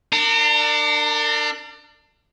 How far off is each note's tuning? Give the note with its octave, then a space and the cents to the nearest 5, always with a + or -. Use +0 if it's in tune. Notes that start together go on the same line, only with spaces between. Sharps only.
D4 +20 A#4 -35